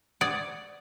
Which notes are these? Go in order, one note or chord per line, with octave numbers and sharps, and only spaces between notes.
D5 F#5 D#6 G#6